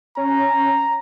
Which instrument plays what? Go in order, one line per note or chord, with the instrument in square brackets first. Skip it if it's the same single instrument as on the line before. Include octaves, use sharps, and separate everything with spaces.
[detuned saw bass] C#4 [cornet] A#5